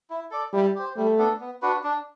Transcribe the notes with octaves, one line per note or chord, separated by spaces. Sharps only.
E4
A4 D5
G3 E4
G4 C5
G3 A3
B3 D4 A4
B3
D4 F#4 B4
D4